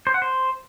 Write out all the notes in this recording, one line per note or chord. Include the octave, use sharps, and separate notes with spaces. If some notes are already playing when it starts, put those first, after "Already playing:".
C5
F#5
C5